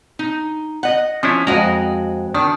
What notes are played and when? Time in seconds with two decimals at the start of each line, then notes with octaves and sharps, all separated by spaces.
0.19 D#4
0.83 D#5 F#5
1.23 F3 C#4 D4 E4
1.47 F2 G#3 F#4 D#5 A#5
2.34 D#3 D4